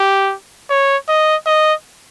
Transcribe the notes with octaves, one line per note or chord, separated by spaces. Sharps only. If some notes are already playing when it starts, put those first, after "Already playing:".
Already playing: G4
C#5
D#5
D#5